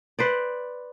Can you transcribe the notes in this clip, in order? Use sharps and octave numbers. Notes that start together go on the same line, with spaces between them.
B4 C5 D5